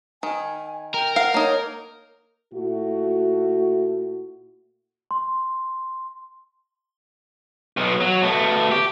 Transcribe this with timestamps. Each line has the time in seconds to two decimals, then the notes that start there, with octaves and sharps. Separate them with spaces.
0.23 D#3 G#5
0.94 A#4 G5
1.16 F5 F#5
1.34 A#3 D#4 C#5
2.53 A#2 A3 E4 F#4
5.11 C6
7.77 B1 B2
8.01 F#3
8.23 B2 A3
8.71 G4